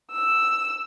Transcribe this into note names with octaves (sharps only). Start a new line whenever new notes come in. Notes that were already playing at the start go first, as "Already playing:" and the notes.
E6